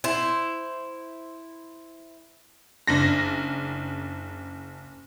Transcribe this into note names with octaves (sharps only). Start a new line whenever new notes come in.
E4 C5
F#1 D4 A#6